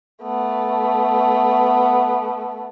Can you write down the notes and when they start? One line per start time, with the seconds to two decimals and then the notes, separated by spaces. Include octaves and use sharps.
0.23 A3 B3